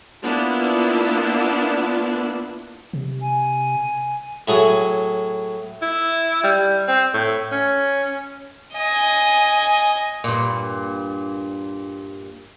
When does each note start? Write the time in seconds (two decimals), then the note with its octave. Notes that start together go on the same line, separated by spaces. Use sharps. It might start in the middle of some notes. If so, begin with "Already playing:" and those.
0.22 A#3 B3 D4 E4 F4
2.93 C3
3.21 G#5
4.48 A2 F#3 G#4
5.82 E4
6.44 G3
6.88 C4
7.14 A2
7.52 C#4
8.74 D#5 G#5
10.24 G2 A#2